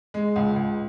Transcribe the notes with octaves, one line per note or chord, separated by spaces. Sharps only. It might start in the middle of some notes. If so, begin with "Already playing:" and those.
G#3
C#2
C#2